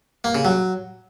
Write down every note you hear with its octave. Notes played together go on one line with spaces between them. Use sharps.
A#3
C#3
F#3